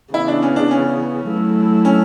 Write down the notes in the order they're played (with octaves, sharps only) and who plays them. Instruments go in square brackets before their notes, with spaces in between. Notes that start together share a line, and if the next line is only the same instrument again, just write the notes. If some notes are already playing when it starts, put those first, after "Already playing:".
[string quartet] C#3 E3 B3 [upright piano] E4
[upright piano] D4
C#4
D4
C#4
[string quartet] F#3 A3 E4
[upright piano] C#4